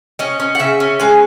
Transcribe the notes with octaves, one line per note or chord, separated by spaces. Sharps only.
C#4 D#5
C#4
F#5
C#3 E5
C#4
G#3 G#5